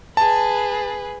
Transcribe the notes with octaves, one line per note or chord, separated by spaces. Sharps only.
G#4 B4 A5